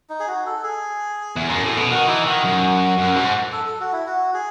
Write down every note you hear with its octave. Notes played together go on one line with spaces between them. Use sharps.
D#4
G#4
F#4
A4
G#4
E2
F#2
A2
B2
D#3 F#4
E3 D#4
D#3 F#4
F#2
F#2
G#2
A4
A4
F#4
E4
F#4
G#4